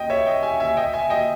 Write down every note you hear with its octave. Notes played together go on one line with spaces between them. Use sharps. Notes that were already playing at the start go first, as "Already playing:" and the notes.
Already playing: D#5 G5
C#5 E5
D#5 G5
E5 G#5
E5 G#5
D#5 G5
E5 G#5
D#5 G5